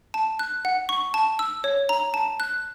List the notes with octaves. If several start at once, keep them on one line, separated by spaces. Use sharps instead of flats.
A5
F#6
F#5
C#6
A5
E6
C#5
A#5
A5
F#6